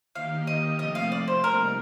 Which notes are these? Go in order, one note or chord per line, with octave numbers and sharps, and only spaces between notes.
D#3 A#3 D#4 G4 F5
D#5
C3 F3 A3 C4 D#5
F5
D5
C5
G3 A#3 D#4 A#4